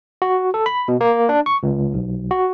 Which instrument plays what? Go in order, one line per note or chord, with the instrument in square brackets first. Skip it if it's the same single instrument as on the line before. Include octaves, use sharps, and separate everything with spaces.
[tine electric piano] F#4
A4
B5
B2
A#3
D4
C#6
C#2
B1
F#4